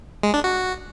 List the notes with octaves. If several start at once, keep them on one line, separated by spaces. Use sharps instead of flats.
G#3
D4
F#4